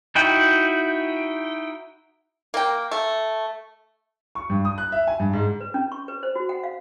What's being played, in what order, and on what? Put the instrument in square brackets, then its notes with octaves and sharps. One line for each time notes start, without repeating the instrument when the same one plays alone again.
[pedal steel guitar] D#4 E4 F#4 G5
[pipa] A#3 G5
A3
[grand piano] C#6
G2
D#6
F#6
E5
G#5
G2
G#2
[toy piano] B4
C#4
C#6
B4
C5
F#4
F#5
F5